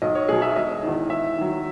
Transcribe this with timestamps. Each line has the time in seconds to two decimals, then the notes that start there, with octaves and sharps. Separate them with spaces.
0.02 B1 D#5
0.15 C#5
0.29 B2 F#3 G#4
0.42 E5
0.56 E1 D#5
0.83 E2 D#3
1.09 E2 E5
1.37 D#3 F#3